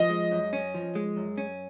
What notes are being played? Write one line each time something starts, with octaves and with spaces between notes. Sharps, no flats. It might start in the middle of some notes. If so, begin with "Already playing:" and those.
Already playing: F3 D#5
G#3
F#2
C#4
F3
G#3
F#2
C#4